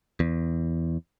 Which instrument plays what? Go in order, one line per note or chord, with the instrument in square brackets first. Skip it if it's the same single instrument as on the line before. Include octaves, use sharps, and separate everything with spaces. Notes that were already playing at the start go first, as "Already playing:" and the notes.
[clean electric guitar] E2